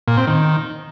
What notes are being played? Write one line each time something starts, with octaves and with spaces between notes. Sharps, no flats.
A#2
C4
D#3